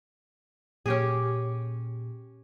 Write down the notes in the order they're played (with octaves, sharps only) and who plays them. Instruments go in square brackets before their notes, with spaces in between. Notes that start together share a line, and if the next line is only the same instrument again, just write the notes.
[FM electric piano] A#2 [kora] C#4 G4 G#4